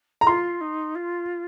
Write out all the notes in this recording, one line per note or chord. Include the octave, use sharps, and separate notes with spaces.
A#5
F4 C6
D#4
F4